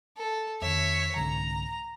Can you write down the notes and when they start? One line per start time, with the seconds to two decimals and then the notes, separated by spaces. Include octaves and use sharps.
0.17 A4
0.62 F2 D#3 C#5 E5
1.16 C2 G#2 D3 A#5